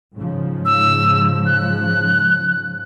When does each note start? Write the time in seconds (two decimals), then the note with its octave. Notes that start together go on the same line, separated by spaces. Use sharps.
0.14 G#2 C#3 F3
0.65 E6
1.46 F#6